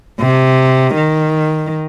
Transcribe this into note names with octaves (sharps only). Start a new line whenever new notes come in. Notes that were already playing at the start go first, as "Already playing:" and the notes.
C3
D#3